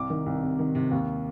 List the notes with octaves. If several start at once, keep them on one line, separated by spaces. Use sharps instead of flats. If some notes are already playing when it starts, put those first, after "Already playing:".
Already playing: C2 D6
D#3
C2
C3
D#3
C3
D#2